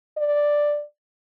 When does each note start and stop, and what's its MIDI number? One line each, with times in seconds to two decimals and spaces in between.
0.18 0.83 74